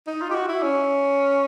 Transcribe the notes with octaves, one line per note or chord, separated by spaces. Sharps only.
D#4
F4
G4
F#4
E4
C#4